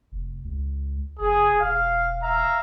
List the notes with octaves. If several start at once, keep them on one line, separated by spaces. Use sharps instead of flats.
F1
C#2
F1 G#4
E1 F5
E5 F5 A#5